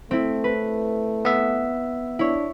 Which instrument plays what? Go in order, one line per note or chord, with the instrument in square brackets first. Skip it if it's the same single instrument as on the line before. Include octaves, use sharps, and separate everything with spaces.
[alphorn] A3 [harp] C4 E4
[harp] B4
[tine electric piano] B3 E5
[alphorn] D4 [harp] E4 C#5